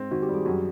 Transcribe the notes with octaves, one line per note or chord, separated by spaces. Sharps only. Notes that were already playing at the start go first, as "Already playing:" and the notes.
Already playing: G#2 C4
D#3 F#4
G4
G3
G#4
F#2 F#4